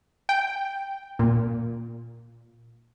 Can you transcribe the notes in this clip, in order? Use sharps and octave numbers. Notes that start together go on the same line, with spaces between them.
G5
A#2